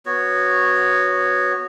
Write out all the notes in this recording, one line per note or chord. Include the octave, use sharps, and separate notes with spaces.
B3 F#4 C#5